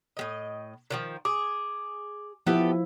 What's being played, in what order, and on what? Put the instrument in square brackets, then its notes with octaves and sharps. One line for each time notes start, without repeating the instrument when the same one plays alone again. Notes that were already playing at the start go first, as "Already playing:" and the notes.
[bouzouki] A2 G#3 D#5
D3 D#3 F3
[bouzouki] G#4 [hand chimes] D6
[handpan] F3 E4 [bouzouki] B3 G4 A4